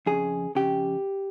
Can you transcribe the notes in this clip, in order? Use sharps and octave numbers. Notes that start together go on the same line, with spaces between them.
F2 C#3 G#4
F2 C#3 G4